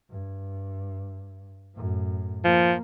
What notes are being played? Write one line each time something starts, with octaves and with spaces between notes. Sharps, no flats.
G2
F#2 A2
F3 A#3